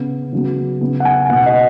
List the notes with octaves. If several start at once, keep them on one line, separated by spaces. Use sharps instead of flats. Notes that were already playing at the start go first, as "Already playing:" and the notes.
Already playing: C#3 B3
C#3 F#3 B3
C#3 B3
F#5
G#5
B2 B3 F#5
D#5